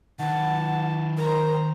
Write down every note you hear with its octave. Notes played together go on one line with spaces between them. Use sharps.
D#3 B4 F#5 A5
A#4 C5 A#5